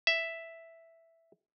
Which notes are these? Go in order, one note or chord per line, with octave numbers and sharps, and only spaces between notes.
E5